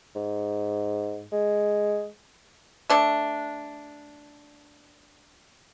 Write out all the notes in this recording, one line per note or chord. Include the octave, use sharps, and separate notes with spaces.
G#2
G#3
A3 D4